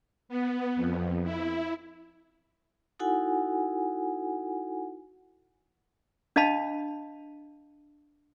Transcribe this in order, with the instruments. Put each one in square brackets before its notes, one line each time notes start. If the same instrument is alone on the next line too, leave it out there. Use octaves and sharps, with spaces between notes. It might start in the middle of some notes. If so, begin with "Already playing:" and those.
[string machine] B3
F2
E4
[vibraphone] D#4 E4 F#4 A4 F#5 G#5
[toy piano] D4 D#5 F5 A5 B5